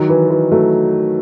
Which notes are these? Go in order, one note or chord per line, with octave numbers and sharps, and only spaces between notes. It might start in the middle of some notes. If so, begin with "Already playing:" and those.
Already playing: D#3 F#3
E3
E3
F#3 A3